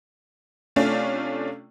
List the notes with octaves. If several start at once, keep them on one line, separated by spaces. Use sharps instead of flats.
C3 A3 C#4 D4 F4